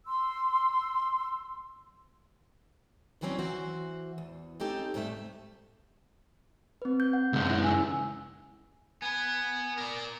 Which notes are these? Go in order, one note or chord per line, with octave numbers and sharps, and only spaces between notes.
C6 E6
G2 D3 E3 F#3 C4 C#4
E3 F#4 C5
E2
C4 C#4 D#4 G4 A4
G#2 C3 G3 A3 E5
C4 B4
G6
F#5
C#2 F#2
E4
G#5 E6
B3 B4 G#5
A#4 D5